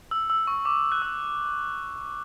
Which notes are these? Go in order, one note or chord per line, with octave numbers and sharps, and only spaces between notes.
E6
E6
C#6
D6
F#6
E6